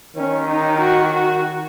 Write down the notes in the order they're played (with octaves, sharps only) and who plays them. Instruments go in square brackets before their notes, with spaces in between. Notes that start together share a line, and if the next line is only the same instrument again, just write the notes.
[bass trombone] D#3 [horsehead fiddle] C#4
[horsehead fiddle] D#4
F#4
F#4